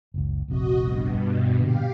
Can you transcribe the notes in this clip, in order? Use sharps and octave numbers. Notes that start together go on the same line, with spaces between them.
F#1 C#2
F1 A#1 C3 F#4 D#5
G2 B2
A#2 D3 G4 F5